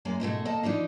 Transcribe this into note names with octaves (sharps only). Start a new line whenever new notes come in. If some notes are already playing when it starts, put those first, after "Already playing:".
F#2 G#3 A#3 G#5
G#2 B2 G#3 A3
D2 A#3 A4 D#5 A5
E3 F3 D4 D#4